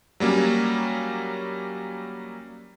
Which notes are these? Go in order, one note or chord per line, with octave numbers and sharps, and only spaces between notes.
F#3 G3 A#3 C#4